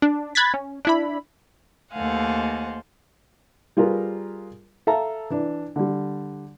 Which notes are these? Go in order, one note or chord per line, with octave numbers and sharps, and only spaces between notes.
D4
B5 F#6 G#6 A6 B6
C#4
D4 E4 B5
D#2 A3 C5 F5 F#5 G#5
G3 F4 G#4 A#4 B4
A4 E5 F5 A5 A#5
E3 D4
D3 G3